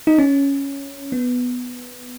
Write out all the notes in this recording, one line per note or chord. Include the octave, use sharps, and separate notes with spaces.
D#4
C#4
B3